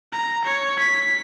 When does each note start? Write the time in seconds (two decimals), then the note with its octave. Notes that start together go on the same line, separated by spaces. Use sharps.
0.13 A#5
0.45 C#5
0.79 B6